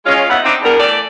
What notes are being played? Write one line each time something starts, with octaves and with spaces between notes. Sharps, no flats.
G#3 C#4 F4
G2 B3 D#4 E5 F#5
C4 D4 D#4
E2 B2 G3 B3 D4 A#4
E3 A3 A4 D5